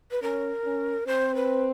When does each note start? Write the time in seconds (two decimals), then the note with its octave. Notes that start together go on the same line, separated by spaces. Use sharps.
0.11 B4
0.22 C#4 A#4
0.64 C#4
1.07 C4 C5
1.35 B4